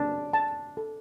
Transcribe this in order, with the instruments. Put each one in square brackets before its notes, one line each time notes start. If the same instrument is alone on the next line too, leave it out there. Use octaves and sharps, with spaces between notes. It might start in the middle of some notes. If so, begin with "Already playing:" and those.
Already playing: [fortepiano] D4 [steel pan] A5
[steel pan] A5
A4